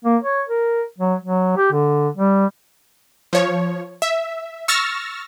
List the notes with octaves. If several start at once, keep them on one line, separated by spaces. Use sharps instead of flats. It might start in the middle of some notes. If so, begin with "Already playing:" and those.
A#3
C#5
A#4
F#3
F#3
G4
D3
G3
F3 C#5
E5
C#6 E6 F6 A6 A#6